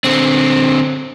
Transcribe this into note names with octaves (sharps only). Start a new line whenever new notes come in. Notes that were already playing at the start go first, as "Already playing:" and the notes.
D3 C4